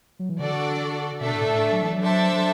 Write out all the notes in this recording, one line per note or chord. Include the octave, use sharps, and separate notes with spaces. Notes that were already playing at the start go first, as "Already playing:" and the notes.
F#3
E3
D3 D4 F#4 A4 D5
B2 A3 D4 A4 E5 A5
A2
A2
F#3
E3
F#3
D4 A4 C5 E5 A5
F#3